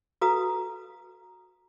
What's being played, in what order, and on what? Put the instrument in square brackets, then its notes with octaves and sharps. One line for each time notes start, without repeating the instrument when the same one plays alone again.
[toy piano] F#4 A4 B4 F5 A#5 D#6